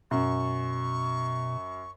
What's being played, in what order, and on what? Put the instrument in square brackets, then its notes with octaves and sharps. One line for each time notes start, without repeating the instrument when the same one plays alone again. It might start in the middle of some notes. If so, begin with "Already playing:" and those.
[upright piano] F#2 [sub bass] B2 [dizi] C#6